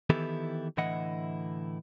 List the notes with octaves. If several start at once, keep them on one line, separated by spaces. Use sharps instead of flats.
D#3 E3 B3 E4 G4 A4
A2 D3 E3 E4 D#5 F#5